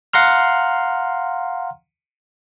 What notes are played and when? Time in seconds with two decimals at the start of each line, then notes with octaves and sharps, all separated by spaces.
0.13 F5 F#5 A#5 C6 F6